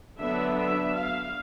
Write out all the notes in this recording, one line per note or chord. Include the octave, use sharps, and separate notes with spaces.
D3 F#3 B3 D4 E5
E5
F5